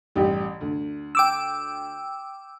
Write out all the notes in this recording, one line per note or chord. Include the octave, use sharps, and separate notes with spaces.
A1 G3 G4
D2
G5 D6 E6